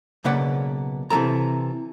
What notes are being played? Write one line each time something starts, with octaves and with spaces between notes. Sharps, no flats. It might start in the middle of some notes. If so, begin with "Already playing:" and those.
B1 C#3 A#3 B4 D5 F#5
C3 E3 G#3 A4 A#5